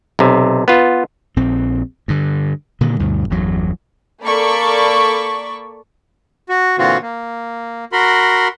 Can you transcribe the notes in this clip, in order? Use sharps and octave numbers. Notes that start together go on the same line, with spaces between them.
B1 C3
B3 F4
A#1 C4
G2 D3
A#2 D3 D#3
D2 G2 B2
G1 E2 F#3
A#3 A4 D5 B5 C#6
F#4
A#2 D3 E3 C4 F4 F#4
A#3
F#4 A#4 B5 C6